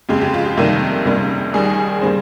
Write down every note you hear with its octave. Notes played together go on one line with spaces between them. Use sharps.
F2 C#3 G#3 G4
G4
F4
G4
F2 C3 D#3 G3 A#3
C#2 C3 G3 A#3
D#2 D#3 G3 G#4
C#3 G3 A#3 C5